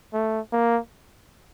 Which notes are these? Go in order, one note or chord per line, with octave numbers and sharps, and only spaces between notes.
A3
A#3